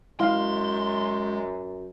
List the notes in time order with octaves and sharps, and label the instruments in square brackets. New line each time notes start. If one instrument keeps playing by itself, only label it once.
[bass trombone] F#2 [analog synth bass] G#3 [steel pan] E4 F5 [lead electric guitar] C6